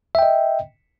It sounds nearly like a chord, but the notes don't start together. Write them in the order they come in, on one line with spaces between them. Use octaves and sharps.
E5 G5 D#5